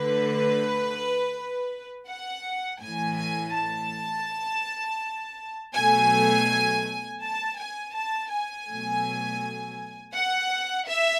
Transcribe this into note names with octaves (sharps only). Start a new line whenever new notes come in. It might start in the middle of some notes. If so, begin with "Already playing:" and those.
Already playing: D3 A3 B4
F#5
A2 E3 A3 G#5
G#5
A5
B2 F#3 A3 G#5
A5
G#5
A5
G#5
B2 F#3 A3
F#5
E5